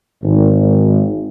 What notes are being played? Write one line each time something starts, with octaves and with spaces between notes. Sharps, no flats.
G#1